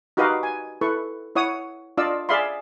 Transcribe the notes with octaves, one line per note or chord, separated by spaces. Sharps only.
D#4 F#4 G4 B4 D#5 F5
G#5
E4 A4 B4 C#6
E4 C#5 F#5 D#6
D4 F4 D5 D#5 F5 E6
G#4 D5 E5 F5 B5 C6